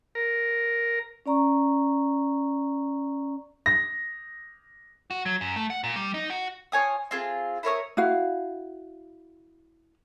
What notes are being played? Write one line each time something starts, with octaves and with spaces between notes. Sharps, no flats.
A#4
C#4 D5 A#5 C#6
A#6
F#4
F#3
F#2
A3
F#5
A#2
G3
D#4
F#4
F4 C#5 G#5 D#6
C4 F4 G#4
E4 A#4 C#5 D#6
E4 F#4 F5